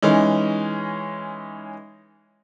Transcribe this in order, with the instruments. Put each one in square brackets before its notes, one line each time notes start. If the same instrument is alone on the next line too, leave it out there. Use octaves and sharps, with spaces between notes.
[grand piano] E3 G#3 C#4 D#4